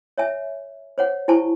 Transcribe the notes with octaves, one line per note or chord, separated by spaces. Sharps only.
C#5 E5 G#5
C5 C#5 F#5
E4 G4 C5 G#5 A5 C#6